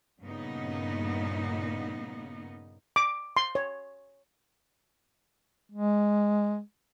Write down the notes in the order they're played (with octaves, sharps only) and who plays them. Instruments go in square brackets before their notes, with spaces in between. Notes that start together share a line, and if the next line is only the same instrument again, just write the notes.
[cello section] G2 A#2 C#3 A#3 B3 D#4
[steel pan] D6
C6
C#5
[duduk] G#3